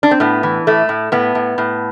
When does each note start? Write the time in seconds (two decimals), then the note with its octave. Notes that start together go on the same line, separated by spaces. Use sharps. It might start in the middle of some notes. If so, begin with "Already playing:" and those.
0.03 D4
0.11 C4
0.20 A2 B3
0.43 E3
0.67 A2 A3
0.89 A2
1.12 A2 B3
1.35 A2
1.58 A2